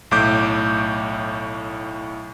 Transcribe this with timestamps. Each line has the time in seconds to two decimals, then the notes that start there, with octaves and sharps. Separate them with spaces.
0.11 B1 A2 D6 G6